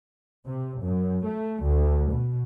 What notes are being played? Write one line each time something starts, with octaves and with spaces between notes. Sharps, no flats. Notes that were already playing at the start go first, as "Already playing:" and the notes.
C3
F#2
A3
D2
B2